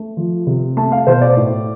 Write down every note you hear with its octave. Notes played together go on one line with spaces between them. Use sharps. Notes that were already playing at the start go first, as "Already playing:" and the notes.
Already playing: A3
F3
C3
A3 A5
F5
B2 C5
D5
A2